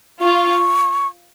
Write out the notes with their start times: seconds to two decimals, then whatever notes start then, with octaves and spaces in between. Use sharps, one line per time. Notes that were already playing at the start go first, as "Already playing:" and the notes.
0.21 F4 C#6